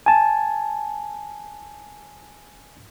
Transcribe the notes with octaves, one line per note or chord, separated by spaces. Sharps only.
G#5 A5